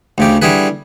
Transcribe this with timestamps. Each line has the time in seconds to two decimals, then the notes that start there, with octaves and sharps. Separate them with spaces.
0.18 D2 C#3 G4
0.42 D3 G3 E4 G#4 B4